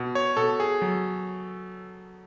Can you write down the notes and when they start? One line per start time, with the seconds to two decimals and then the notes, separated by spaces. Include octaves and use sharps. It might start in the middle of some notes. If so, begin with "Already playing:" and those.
Already playing: B2
0.15 C#5
0.37 B2 A4
0.60 G#4
0.82 F#3